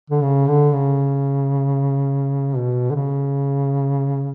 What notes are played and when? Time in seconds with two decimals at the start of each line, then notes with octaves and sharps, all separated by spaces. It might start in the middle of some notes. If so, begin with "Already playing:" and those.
0.10 D3
0.22 C#3
0.48 D3
0.74 C#3
2.56 B2
2.90 D3
2.95 C#3